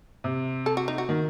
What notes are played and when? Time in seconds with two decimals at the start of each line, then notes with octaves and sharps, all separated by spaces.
0.24 C3
0.66 A4
0.77 F#4
0.88 D#4
0.98 F#4
1.09 D#3